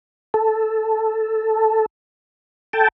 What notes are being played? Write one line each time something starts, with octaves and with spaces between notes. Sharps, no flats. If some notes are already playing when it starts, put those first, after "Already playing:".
A4
A4 G5 A5